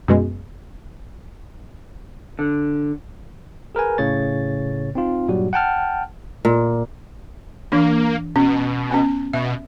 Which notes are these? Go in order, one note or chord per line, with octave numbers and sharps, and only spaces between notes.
F#2 B2 G#3
D3
G#4 A#4 B4 G#5
A2 C#3 C#5 A6
C4 D#4 F4
G2 A#2 F#3 G3 F#4
F#5 G5 A5 F6
A#2
E3 A#3 D4
B2 C#4
B3 C#4
B2 E5